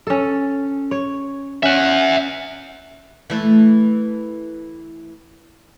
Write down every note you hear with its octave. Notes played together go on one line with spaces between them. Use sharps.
C#4 A4
C#5
C#4 E5 F#5
E3 A3